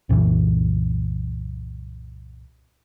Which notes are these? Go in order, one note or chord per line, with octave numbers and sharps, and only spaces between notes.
C2 F#2 A#2 E3